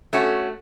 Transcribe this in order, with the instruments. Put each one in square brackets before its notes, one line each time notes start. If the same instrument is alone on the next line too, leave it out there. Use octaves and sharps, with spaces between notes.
[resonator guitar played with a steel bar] A3 C#4 F#4